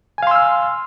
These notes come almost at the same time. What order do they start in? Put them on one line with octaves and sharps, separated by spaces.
G#5 F5 C6 E6 F6